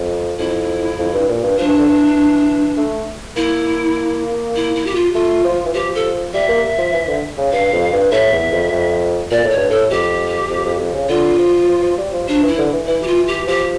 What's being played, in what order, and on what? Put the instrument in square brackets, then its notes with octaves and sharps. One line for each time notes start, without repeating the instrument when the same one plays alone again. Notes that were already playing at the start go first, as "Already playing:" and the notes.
Already playing: [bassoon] F2
[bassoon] F2 [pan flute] E4
[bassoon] F2
G2
A#2
G2
[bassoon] F3 [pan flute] D4
[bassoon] E3
D3
E3
A3
[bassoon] A#3 [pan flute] E4
[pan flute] E4
E4
G4
F4
[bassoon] A3 [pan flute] F4
[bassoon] F3
E3
[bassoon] F3 [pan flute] G4
[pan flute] A4
[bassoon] G3 [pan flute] E5
[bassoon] A#3
F3
E3
D3
C#3
[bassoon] G2 [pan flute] F5
[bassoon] F2
G2
[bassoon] A2 [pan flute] E5
[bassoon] E2
F2
F2
[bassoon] A#2 [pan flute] D5
[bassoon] A2
[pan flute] C#5
[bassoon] G2
[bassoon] A2 [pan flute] A4
[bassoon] F2 [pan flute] G4
[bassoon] F2
F2
F2
C#3
[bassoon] D3 [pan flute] F4
[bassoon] F3
F3
F3
G3
F3
[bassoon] F3 [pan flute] D4
[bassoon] E3
[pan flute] E4
[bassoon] D3
E3
[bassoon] E3 [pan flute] E4
[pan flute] G4
F4
G4
[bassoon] F3 [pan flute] G4